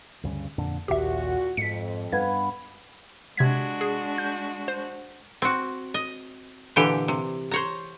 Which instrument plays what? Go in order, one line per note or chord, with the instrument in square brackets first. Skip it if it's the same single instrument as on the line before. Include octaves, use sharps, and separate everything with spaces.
[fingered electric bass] D2 G2 C#3
F2 A#2 D3
[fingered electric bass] A#1 D#2 [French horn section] A#2 F#4 [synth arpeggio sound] G4 E5
[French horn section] F2 [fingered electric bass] G#2 [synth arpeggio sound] B6 C#7
[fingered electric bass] G2 [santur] B3 B4 F5 [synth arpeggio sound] G#6
[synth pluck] C3 G#6 B6 [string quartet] G#3 D4 F#4
[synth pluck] G#4
G6
C5
[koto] C4 F#4
D#5
A#2 D3 E3 G4
C3
C5 C#5 A#5